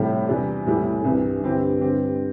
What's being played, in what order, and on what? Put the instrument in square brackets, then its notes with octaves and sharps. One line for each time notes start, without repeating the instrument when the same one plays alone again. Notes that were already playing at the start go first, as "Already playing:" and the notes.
Already playing: [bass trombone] A2 [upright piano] C3 G3 E4 G4
[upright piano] E2 C3 E3 G3 D4
[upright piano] E2 C3 G3 E4 G4 [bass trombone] A2
[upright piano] C2 C3 E3 [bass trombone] G2
[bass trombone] G2 [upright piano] D3 C4 E4 G4
[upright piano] D3 C4 G4